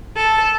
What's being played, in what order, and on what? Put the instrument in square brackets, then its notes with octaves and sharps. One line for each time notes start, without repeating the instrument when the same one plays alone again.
[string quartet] A4